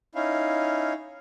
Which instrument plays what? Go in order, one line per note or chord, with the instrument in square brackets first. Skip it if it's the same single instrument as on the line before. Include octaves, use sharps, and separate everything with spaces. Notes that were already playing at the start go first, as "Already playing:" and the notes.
[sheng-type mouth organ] C#4 D#4 E4 F5